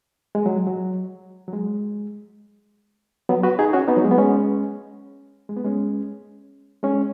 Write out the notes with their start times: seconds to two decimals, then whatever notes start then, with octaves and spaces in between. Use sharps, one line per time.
0.35 G#3
0.46 F#3
0.67 F#3
1.48 F#3
1.53 G#3
3.29 F#3 B3
3.43 F#4 B4
3.59 D#4 G#4
3.73 C#4 F#4
3.88 B3 D#4
3.97 F#3
4.04 G#3
4.11 B3
4.18 G#3 C#4
5.49 G#3
5.57 B3
5.65 G#3 C#4
6.83 G#3 C#4